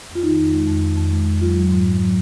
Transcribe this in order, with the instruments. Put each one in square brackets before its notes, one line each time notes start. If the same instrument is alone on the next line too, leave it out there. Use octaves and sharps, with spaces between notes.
[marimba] F2
F4
D#3 D#4
F2
G#3
F2
D#3
F2
G#3
F2
F#3 F4
F#3
G#2
G#2
F#3